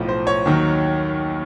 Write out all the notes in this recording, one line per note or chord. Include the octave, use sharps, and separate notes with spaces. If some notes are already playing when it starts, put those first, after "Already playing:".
Already playing: B1 A2 F3
C5
C#5
D#2 D#3 F#3